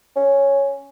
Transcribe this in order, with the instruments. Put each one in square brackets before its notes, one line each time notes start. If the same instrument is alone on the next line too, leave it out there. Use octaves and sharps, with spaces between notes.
[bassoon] C#4